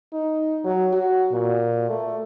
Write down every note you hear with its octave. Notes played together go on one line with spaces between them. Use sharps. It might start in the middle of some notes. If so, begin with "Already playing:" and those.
D#4
F#3
F#4
A#2
A3